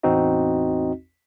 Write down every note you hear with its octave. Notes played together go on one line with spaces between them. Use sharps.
A1 E2 C4 D#4 F#4 D#5